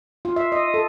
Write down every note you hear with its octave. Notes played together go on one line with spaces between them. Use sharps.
F4
E5
D#5
A4